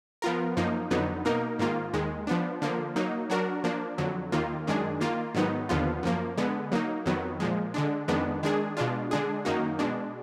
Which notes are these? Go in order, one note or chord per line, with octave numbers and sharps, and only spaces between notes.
F3 B3 F4 A#4
F#2 F3 A#3 D#4
F2 D3 F#3 B3 D#4
B2 A#3 D#4 A#4
G#2 D#3 A#3 F4
D#2 D#3 G#3
F3 B3 D4
D3 F3 A#3
F#3 A#3 D#4
F#3 D4 F#4 A#4
F3 A#3 D4
F2 D3 F#3
D#2 D#3 A#3 F4
F#2 D#3 G#3 D4 G#4
D#3 A#3 F4
G#2 D#3 F#3 B3 D#4
D#2 D3 F3 B3 F4
F#2 F3 A#3
D3 G#3 B3
F#3 A#3 D#4
F2 D#3 F#3 B3
A#2 F3 G#3
D3 G#3 D4
F2 D#3 G#3 B3 D4
D#3 G#3 D4 G#4
B2 G#3 D4 F4
D3 G#3 D4 G#4
F#2 D#3 A#3 D#4 F#4
B2 G#3 D4